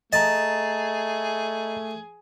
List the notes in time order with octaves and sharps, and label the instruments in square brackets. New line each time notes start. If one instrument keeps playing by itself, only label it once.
[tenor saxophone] A3 [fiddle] G#4 [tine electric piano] D#5 A#5 [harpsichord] A5